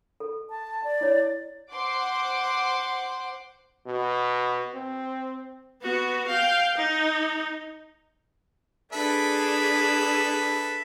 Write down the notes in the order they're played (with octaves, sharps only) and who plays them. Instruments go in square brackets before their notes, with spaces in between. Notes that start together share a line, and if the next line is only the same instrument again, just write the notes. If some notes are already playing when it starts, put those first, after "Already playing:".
[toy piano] A4
[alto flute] A5
D5
[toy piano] E4 C#5
[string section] C5 F#5 C6 D6
[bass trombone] B2
C4
[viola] B3 F#4
F5 G5
D#4
[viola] D4 G#4 [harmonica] A4 B4 E5